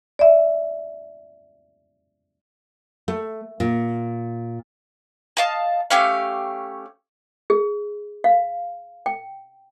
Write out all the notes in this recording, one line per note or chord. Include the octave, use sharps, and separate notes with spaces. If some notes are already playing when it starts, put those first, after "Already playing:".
D5 E5
A3
A#2
D#5 F5 A5
A3 C#4 G4 F5
G#4
F5
G5